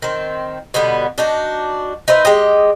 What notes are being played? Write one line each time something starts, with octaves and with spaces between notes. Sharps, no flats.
D#3 C4
B2 D3 G3 B3
D4 D#4 F#4
D#4 B4 C5 E5
G#3 G4 D#5